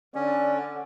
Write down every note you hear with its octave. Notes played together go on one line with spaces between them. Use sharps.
D3 C#4 D5